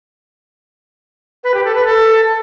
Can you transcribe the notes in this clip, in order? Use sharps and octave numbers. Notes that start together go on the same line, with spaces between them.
B4
G4
A4
B4
A4